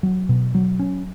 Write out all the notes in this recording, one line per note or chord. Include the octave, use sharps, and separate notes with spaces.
F#3
B2
F#3
C#4